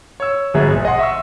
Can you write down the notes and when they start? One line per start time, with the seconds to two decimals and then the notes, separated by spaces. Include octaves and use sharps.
0.20 C#5 E6
0.54 G1 G#2 B2 G#4 E5 A#5
0.70 A#1
0.85 D#5 F#5 C6
0.99 E5 C#6 E6